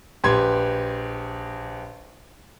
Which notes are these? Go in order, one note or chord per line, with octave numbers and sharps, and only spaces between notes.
A#1 G4 B4 C6 G#6